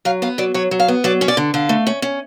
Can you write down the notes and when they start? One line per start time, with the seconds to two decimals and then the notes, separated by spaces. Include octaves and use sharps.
0.05 F#3 F5
0.22 B3 F5
0.38 F#3 D5
0.54 F#3 C#5
0.71 F#3
0.80 F5
0.88 B3
1.04 F#3 D5
1.21 C#4
1.28 D5
1.37 D3
1.54 D3 F5
1.69 A3
1.87 C#4
2.02 C#4